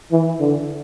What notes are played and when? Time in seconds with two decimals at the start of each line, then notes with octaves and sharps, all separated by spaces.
0.12 E3
0.40 D3